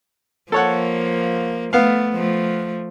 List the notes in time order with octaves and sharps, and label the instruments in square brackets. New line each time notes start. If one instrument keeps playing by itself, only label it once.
[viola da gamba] F3 A#3 [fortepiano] A4 C#5 F#5
[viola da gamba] A3 [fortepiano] B3 F5
[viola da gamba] F3 A3